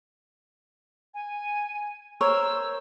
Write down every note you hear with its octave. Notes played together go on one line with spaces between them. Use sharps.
G#5
A#4 C5 C#5 E6